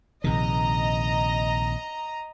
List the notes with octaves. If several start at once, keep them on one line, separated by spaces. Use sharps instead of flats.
A#1 C3 D#3 D#5 A#5